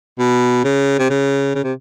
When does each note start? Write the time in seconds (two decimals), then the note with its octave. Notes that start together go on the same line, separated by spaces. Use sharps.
0.19 B2
0.64 C#3
0.99 C3
1.10 C#3
1.55 C#3
1.64 C3